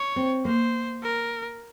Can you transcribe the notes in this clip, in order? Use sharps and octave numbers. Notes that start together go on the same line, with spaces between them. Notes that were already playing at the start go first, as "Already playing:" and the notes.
Already playing: C#5
C4
A#3 C5
A#4